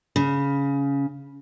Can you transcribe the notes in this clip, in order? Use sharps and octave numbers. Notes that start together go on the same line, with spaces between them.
C#3